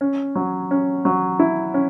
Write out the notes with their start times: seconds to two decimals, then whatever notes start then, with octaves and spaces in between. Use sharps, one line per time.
0.01 C#4
0.36 F#3
0.71 C#4
1.05 F#3
1.40 E4
1.74 C#4